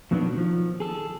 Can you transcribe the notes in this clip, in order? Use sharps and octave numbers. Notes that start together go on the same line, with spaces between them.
F2 B2 D#3 F#3 B3 D4
D#3 F3
G#4 A4